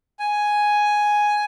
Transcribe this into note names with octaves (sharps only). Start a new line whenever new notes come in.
G#5